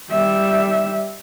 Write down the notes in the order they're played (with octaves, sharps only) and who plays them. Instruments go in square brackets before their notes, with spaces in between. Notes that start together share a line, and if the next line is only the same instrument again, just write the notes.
[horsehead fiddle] G3 E5